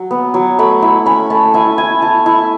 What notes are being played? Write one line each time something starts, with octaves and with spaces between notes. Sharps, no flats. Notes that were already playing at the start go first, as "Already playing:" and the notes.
Already playing: F#3
B3
F#3
A3 B5
E4
C#4 B5
A3 A5
E4 G#5
E4 G#5
E4 A5
E4